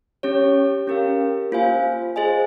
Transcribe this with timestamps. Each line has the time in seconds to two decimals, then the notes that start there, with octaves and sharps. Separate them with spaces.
0.23 C#4 G4 C#5
0.87 C#4 G4 A#4 F5
1.52 A#3 F4 C5 F5 G#5
2.16 G#4 C5 D#5 G#5